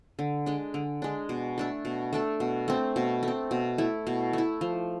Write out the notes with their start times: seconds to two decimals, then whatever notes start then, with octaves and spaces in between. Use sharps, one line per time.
0.19 D3
0.46 G#3 D4
0.74 D3
1.02 G#3 D4
1.29 B2
1.58 A3 D4 A4
1.85 B2
2.13 A3 D4 A4
2.40 B2
2.68 A3 C4
2.96 B2
3.23 A3 C4
3.51 B2
3.78 A3 E4
4.07 B2
4.33 A3 E4
4.61 F3